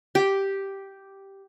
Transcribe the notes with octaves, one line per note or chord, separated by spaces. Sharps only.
G4